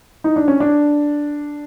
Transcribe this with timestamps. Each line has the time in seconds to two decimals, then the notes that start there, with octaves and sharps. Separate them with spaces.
0.24 D#4
0.36 D4
0.48 C#4
0.60 D4